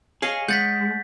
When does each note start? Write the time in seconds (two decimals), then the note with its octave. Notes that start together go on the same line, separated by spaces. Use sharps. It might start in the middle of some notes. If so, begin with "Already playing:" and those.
0.22 G#4 C#5 D#5 F5
0.48 G#3 F#5 G6 A6 B6